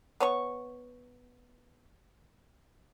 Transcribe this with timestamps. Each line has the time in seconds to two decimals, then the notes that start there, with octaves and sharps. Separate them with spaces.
0.20 B3 C#5 C#6